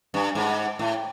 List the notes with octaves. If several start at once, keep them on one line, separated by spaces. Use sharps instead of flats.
G2
G#2
A2